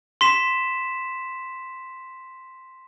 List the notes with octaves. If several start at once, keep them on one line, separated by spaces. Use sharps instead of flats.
C6 B6 E7